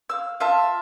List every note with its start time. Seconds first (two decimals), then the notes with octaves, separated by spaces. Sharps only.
0.09 F5 E6
0.40 F4 E5 A5